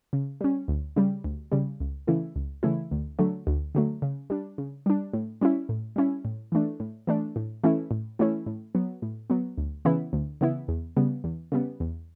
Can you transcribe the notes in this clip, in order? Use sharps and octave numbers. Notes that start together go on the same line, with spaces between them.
C#3
G3 C#4
D2
C#3 G3
D2
C#3 G3
C#2
C#3 E3 A3 E4
C#2
C#3 E3 A3 E4
D2
D3 F#3 A3
D2
D3 F#3 A3
C#3
G3 D4
C#3
G3 D4
A2
G3 C#4 E4
A2
G3 C#4 E4
A2
E3 A3 D4
A2
E3 A3 D4
A2
E3 A3 C#4 E4
A2
E3 A3 C#4 E4
A2
F#3 B3
A2
F#3 B3
D2
C#3 E3 B3 E4
D2
C#3 E3 B3 E4
E2
C#3 G3 B3
E2
C#3 G3 B3
E2